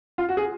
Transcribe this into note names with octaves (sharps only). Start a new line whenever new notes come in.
F4
F#4
G#4